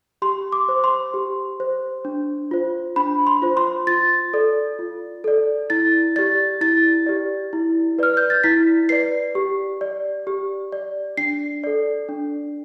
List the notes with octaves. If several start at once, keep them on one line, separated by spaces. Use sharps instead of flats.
G4 C6
D6
C5
C6
G4
C5
D4
F4 C5
D4 B5
C6
F4 C5
C6
F4 A6
A4 D5
F4
A4 D5
E4 A6
G4 D5 A6
E4 A6
G4 D5
E4
B4 D5 F6
G6
A6
E4 B6
B4 D5 C7
G4
D5
G4
D5
D4 C7
A4 D5
D4